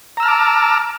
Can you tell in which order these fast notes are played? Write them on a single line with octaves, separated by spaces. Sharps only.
A#5 E6 F6 A5 D6